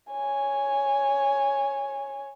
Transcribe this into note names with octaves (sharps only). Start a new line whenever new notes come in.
C#5 G#5